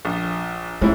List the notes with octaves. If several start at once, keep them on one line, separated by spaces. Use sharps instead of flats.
A#1
G#2 A3 C#4 E4